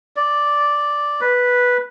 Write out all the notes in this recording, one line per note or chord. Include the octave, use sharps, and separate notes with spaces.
D5
B4